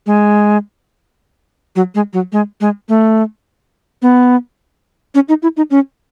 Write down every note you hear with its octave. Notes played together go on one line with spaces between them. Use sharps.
G#3
F#3
G#3
F#3
G#3
G#3
A3
B3
C#4
D#4
E4
D#4
C#4